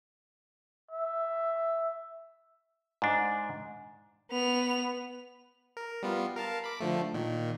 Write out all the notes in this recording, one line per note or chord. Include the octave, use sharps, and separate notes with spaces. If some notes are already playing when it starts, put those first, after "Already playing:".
E5
G#2 D4
B3 F7
A#4
G3 B3 F4
A#4 F5 A5
B5 D6
D3 F3 A3
A#2 D#3